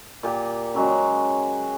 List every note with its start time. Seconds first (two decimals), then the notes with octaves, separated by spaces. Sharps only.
0.23 A#2 G4
0.74 C#3 F#3 G#3